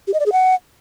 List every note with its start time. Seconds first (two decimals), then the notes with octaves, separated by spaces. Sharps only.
0.07 G4
0.14 D#5
0.20 D5
0.26 G#4
0.32 F#5